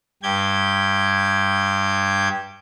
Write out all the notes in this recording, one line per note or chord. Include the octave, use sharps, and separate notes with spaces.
G2 G4 G6 G#6